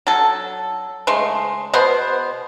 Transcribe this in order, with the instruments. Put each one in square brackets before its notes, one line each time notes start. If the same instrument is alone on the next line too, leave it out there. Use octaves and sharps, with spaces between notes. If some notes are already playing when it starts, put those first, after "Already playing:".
[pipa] F#3 A4
C#3 G#3 A3 C6
B2 B3 C5 C6